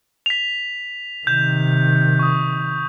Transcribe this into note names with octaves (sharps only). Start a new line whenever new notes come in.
B6 F7
C3 D#3 G6
C#6 D#6